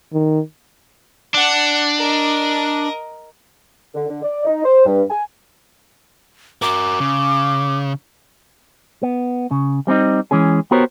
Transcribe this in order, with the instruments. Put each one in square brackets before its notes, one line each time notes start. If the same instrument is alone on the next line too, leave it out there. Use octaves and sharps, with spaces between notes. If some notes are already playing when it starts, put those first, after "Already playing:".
[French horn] D#3
[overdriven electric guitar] D4 [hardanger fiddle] F#5
[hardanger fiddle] A#4 D#5
[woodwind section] D3
D3
D5
D#4
C5
G2
G#5
[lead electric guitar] F#4 A#4 [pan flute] D6
[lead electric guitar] C#3
[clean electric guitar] B3
C#3
G3 C4 C#4 D#4
E3 G#3 C#4 G#4
B3 F#4 G4 A#4 C5 C#5